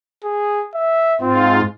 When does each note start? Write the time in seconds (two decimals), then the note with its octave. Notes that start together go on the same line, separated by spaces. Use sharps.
0.24 G#4
0.75 E5
1.21 G#2 C4 F4